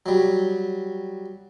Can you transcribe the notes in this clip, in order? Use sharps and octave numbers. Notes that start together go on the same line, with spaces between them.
F#3 G3